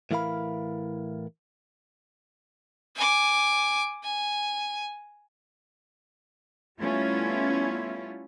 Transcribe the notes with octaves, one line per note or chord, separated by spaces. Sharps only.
A2 E3 E4 A#4 F5 B5
G#5 D6
G#5
G3 A3 B3 C#4 E4 F4